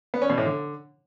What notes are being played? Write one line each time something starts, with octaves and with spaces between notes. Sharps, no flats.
B3
C#4
B2
A2
D3